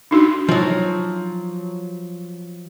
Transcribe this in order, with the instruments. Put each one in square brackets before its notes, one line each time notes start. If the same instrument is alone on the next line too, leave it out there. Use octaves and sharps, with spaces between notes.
[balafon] D4 D#4 F#4
[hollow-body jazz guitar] F3 F#3